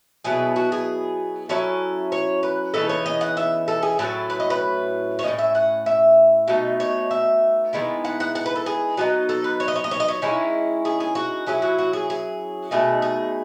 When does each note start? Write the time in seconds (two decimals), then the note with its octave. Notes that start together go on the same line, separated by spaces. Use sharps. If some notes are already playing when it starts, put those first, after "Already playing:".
0.25 B2 F#3 B3 E4 G#4
0.56 F#4
0.72 G#4
1.49 F#3 C#4 E4 A4
2.12 C#5
2.43 B4
2.74 C#3 E3 B3 D#4 A4
2.89 C#5
3.06 D#5
3.21 F#5
3.37 E5
3.68 A4
3.83 G#4
3.99 A2 F#3 A3 C#4 A4
4.30 B4
4.40 D#5
4.50 B4
5.19 C#5
5.23 F#3 C#4 D#5
5.28 A2
5.39 E5
5.55 F#5
5.86 E5
6.48 B2 A3 D#4
6.80 C#5
7.11 E5
7.73 D#3 G#3 B3 E4
8.05 F#5
8.20 F#5
8.35 F#5
8.46 B4
8.55 A4
8.66 G#4
8.97 F#3 B3 D#4 G#4
9.29 A4
9.44 B4
9.60 C#5
9.68 D#5
9.76 C#5
9.84 D#5
9.91 C#5
10.00 D#5
10.08 C#5
10.22 D#3 G#3 C#4 E4
10.85 G#4
11.00 G#4
11.15 F#4
11.47 F#3 C#4 E4 G#4
11.62 F#4
11.78 F#4
11.93 G#4
12.10 G#4
12.71 B2 A3 D#4 G#4
13.02 G#4